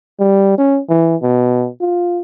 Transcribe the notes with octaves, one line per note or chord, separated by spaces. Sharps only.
G3
C#4
E3
B2
F4